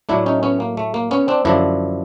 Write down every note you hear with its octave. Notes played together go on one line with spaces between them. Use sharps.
A2 F#3 A3 D4 E4
C#4 D#4
B3 C#4
A#3
A3
A#3
B3 C#4
C4 D4
F#2 D3 F3 D4 E4